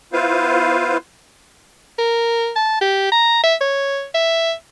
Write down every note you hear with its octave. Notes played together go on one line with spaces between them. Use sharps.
B3 E4 F4 B4 C5 F5
A#4
A5
G4
A#5
E5
C#5
E5